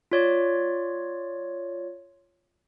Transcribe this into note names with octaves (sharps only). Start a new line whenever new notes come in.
F4 C#5 D5